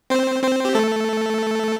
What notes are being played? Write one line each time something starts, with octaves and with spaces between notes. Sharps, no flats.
C4 C5
C4 C5
G4
A3 A4